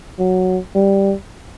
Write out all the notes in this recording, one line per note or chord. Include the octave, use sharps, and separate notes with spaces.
F#3
G3